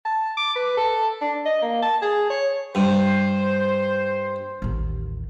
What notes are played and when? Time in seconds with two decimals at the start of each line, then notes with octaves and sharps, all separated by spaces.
0.05 A5
0.37 D6
0.56 B4
0.77 A4
1.22 D4
1.45 D#5
1.62 A#3
1.82 A5
2.02 G#4
2.30 C#5
2.75 G2 C5
4.62 A1 D#2